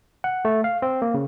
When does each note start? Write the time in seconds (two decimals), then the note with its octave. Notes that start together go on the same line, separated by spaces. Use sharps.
0.24 F#5
0.45 A3
0.64 F5
0.82 C4
1.02 A#3
1.14 C#3